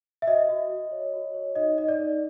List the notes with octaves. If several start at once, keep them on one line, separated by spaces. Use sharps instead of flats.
E5
F#4 D#5
F#4
F#4
C#5
F#4
C#5
D#4 D#5
D#4 D#5
D5
D#4